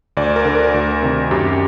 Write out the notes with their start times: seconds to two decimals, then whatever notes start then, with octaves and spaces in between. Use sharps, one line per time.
0.17 D2 D5
0.36 A#4
0.45 D3
0.55 A#4
0.74 D2
1.02 C3 D#3
1.31 F#2 G4